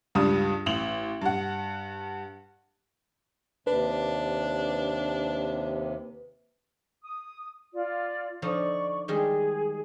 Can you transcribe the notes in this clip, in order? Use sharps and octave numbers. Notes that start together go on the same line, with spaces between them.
C#2 G2 G3 D4 D#6
A1 F#7
G2 F#5
D#2 C3 D4 B4
D#6
F4 D5
D3 F3 D#4 D5 C#6
D#3 G3 G#3 G#4